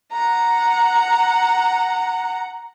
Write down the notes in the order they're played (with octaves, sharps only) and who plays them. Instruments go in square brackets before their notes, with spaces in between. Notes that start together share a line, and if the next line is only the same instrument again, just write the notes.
[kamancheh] F#5 A#5